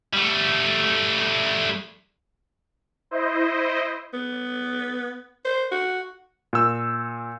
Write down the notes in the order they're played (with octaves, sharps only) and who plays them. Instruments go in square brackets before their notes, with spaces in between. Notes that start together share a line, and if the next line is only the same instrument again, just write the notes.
[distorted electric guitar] G3 A3
[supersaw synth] E4 C5 D#5
[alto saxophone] B3
C5
F#4
[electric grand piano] A#2 E6